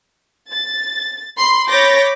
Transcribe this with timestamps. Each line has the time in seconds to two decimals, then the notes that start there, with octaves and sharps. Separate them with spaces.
0.50 A6
1.38 B5 C6
1.69 C#5 B5 D6 G6 A6 A#6